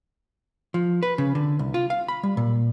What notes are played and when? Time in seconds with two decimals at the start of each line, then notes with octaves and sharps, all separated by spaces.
0.74 F3
1.03 B4
1.18 C#3
1.35 D3
1.59 C2
1.74 F4
1.90 F5
2.08 B5
2.23 G3
2.37 A#2